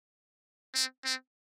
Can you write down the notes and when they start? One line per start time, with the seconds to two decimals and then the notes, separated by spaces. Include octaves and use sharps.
0.75 C4
1.05 C4